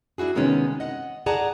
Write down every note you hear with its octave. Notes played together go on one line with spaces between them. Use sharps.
D4 E4 F#4 G#4
C3 D#3 G#3 B3 C#4
D#5 F#5
G#4 D5 F#5 A5 A#5